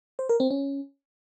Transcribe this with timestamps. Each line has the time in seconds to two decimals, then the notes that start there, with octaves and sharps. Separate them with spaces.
0.19 C5
0.29 A#4
0.40 C4
0.50 C#4